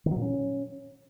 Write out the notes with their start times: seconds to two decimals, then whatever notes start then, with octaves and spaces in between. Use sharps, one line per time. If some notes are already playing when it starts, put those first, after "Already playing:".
0.06 D#3
0.11 F#3
0.16 A#2
0.22 C#4